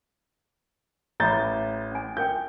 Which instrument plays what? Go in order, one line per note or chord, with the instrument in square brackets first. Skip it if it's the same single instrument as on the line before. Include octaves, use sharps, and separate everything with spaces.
[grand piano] A1 G6 A6 [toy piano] A#5 B5
[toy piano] C#4 G#5
[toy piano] D4 A#4 G5 [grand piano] G6